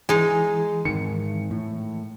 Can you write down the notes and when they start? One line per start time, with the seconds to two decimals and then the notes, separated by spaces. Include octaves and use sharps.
0.09 E3 G#3 D#4 G#4
0.85 G#2 D#3 C#7
1.51 A2